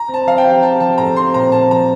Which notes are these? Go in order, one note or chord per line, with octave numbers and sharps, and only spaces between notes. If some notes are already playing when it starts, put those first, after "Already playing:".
Already playing: A#5
C4
A5
F3 F5
G5
G4
G4 A5
F3 A5
A2 A#5
C4 C6
A#2 A#5
A#3 A5
F3 A#5